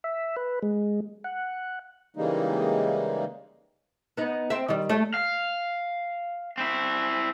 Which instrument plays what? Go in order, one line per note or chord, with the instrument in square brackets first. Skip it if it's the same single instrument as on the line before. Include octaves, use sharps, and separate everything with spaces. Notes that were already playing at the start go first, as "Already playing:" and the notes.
[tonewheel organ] E5
B4
G#3
F#5
[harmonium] C#3 E3 G3 G#3 A#3 D#4
[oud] B3 D#4
C4 E5
D#3 G3
A3 C#5
[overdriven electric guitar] F5
C4 E4